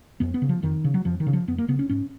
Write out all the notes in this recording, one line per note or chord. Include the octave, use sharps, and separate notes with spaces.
F2 B3
B3
C#3
F3
F2 D#3
C#3
F#3
F2 F3
D#3
C#3
F3
F2 B3
A#3
C#3 B3
C#4
G#2 C#4